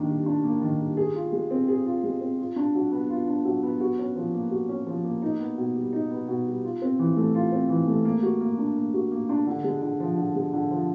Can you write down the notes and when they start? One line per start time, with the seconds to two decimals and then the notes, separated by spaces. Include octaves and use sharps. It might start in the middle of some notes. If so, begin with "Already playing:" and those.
Already playing: D#3 A#3 D4
0.09 G3
0.26 D4
0.44 A#3
0.61 D#3
0.79 G3
0.97 G#4
1.15 F4
1.32 G#3
1.51 C4
1.68 G#4
1.86 F4
2.04 G#3
2.21 C4
2.38 F4
2.56 D4
2.74 F#3
2.91 B3
3.09 F4
3.27 D4
3.45 F#3
3.63 B3
3.80 F#4
3.99 C#4
4.16 F3
4.34 A#3
4.51 F#4
4.69 C#4
4.87 F3
5.04 A#3
5.22 D#4
5.39 B3
5.57 B2
5.75 G3
5.93 D#4
6.11 B3
6.28 B2
6.46 G3
6.64 F4
6.82 C4
6.99 E3
7.17 A3
7.35 F4
7.52 C4
7.69 E3
7.88 A3
8.05 A#3
8.23 F#4
8.41 A#3
8.58 D4
8.76 A#3
8.94 F#4
9.11 A#3
9.29 D4
9.47 D3
9.64 G#3
9.82 D3
10.00 F3
10.17 D3
10.35 G#3
10.53 D3
10.71 F3